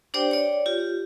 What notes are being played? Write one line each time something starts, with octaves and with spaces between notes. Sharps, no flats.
D4 G4 C5 D5 G5
C#5 D5
F4 G4